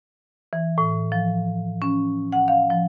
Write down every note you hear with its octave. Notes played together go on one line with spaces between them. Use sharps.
E3
A2
F3
C#4
F#5
F5
F3